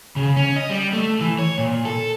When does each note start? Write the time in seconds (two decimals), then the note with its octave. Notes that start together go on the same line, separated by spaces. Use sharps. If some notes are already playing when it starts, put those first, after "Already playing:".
0.16 C#3
0.37 C#4
0.56 D#5
0.70 G3
0.93 A3
1.21 E3
1.39 C#5
1.58 A#2
1.85 A4